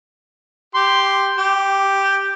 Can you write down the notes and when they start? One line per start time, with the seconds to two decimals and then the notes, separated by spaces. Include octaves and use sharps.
0.75 G4 C6
1.38 G4